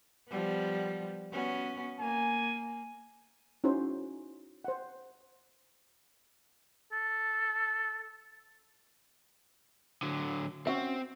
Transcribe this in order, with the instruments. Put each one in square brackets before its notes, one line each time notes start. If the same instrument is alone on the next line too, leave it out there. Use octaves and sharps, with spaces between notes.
[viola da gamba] F3 G3 B3
B3 C#4 F#4
[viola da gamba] A#3 [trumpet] G#5
[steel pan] C#4 D#4 E4 F#4 C5
C5 F#5
[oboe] A4
[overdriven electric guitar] D3 F#3
[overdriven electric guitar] C4 [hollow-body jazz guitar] C#4 F#4 E5